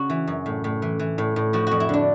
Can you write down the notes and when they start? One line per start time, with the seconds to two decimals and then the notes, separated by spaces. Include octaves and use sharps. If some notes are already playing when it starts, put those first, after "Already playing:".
Already playing: C#3 F#4
0.10 E3
0.27 F#2
0.46 A2
0.64 A2
0.82 E3
0.99 E3
1.18 A2
1.36 A2
1.53 F3 F#4
1.67 F2 F#4
1.80 E4
1.89 D3 D4